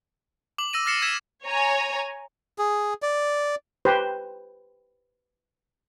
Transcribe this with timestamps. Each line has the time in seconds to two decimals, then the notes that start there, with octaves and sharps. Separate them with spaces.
0.58 D6 F#7
0.73 E6 A#6 D#7
0.86 F6 A6 A#6 C7 C#7 E7
1.02 E6 G#6 B6 E7
1.45 C#5 G#5 A#5
2.58 G#4
3.02 D5
3.85 G4 B4 C5